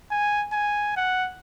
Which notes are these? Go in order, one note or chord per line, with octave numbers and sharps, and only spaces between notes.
G#5
G#5
F#5